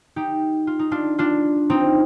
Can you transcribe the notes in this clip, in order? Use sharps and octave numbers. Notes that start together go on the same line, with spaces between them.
D#4 G4
F4
D#4
D4 F4
D4 F4
C4 D#4